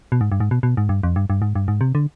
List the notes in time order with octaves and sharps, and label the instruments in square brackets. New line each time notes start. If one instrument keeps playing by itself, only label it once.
[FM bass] B2
G#2
G2
G#2
B2
B2
G#2
G2
F2
G2
G2
G#2
G2
G#2
C3
D3